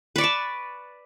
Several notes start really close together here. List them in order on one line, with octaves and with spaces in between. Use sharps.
B4 D5 C#6 A5